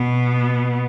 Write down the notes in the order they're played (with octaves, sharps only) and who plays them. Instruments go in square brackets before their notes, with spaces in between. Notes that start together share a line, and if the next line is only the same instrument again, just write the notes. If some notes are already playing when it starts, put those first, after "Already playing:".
Already playing: [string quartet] B2 B3